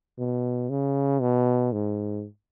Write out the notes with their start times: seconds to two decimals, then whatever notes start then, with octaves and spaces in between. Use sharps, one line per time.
0.19 B2
0.70 C#3
1.21 B2
1.72 G#2